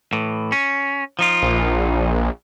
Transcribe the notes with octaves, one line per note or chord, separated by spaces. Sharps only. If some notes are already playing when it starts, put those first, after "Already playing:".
A2 E3
C#4
F3 D#4 F4
A#1